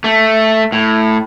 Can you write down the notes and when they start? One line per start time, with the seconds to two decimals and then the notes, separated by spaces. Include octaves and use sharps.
0.04 A3
0.72 A2